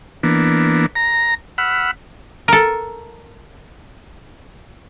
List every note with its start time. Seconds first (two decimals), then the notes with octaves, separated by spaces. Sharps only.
0.23 E3 A#3 B3 D4
0.96 A#5
1.58 F#5 B5 E6 F6
2.48 A4 A#4